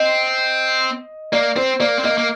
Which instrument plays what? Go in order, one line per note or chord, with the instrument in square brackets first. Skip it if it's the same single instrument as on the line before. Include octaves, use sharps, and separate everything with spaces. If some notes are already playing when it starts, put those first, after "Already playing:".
Already playing: [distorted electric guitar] C4 [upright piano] D#5
[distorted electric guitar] A#3 [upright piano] D5
[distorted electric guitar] C4 [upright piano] C5
[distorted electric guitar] A#3 [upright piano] D5
[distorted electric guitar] C4
[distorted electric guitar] A#3 [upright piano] D#5
[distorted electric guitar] A#3